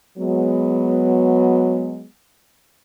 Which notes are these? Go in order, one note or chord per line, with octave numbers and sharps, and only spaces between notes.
F#3 G#3 B3